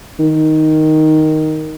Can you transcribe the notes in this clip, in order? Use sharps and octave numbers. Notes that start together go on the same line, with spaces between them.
D#3